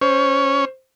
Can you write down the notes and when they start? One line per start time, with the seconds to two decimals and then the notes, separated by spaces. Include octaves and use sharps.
0.01 C#4 C5 C#5